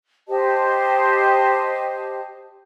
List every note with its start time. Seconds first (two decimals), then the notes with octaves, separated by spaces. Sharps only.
0.28 G4 C5 D#5 A5